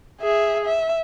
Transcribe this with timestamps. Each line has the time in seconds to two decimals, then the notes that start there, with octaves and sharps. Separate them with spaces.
0.21 G#4 E5
0.65 E5